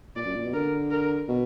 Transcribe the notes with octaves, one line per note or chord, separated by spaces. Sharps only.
A#2 D5
F#2
A#2
B2
D3 A#4
A#4
B2